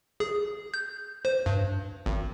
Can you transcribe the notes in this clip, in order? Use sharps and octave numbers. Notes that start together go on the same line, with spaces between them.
G#4
G6
C5
G2
G#1